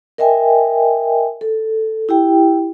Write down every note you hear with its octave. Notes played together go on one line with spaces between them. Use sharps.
A#4 D#5 E5 G5 G#5
A4
E4 G4 G5